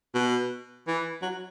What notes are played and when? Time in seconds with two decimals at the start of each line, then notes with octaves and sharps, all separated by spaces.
0.14 B2
0.87 E3
1.22 F#3